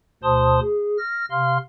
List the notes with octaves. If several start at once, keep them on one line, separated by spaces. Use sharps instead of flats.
D2 B2 C5 A5 C6 D#6
G#4
F6 A#6
C3 F5 C6 F6